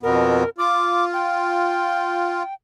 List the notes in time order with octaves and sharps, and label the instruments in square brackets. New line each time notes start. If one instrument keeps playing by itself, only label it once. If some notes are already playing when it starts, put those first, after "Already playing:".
[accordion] F2 B2 B3 [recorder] A#4
[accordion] F4 [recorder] D6
[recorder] G5